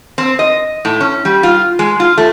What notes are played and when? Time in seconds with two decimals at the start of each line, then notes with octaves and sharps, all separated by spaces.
0.18 C4
0.39 D#5
0.85 A2
1.01 C#4
1.25 G3
1.43 F4
1.79 G#3
2.00 F4
2.18 A3